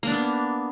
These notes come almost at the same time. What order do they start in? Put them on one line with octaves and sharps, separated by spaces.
A#3 D4 B3